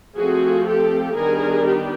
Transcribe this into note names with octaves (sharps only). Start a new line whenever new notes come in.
F3 A3 C4 F#4 G#4
G4 A4
D#3 G3 B3 D4 G#4 A#4
G4